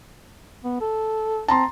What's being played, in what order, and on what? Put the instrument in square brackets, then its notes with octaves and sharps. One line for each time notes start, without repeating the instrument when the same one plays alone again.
[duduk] B3
A4
[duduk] C4 [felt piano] A5 A#5 C6